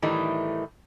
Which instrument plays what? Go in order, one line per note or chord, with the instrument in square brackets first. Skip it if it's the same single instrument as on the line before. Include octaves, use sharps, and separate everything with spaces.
[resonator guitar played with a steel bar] A2 D#3 E3 G3 A3 D#4